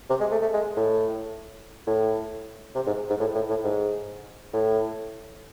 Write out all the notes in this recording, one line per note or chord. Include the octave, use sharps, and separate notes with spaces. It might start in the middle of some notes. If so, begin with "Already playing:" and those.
C3
G#3
A3
A3
G#3
A2
A2
C3
G#2
G#2
A2
A2
A2
G#2
A2